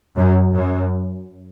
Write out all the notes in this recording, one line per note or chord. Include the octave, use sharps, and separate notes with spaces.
F#2
F#2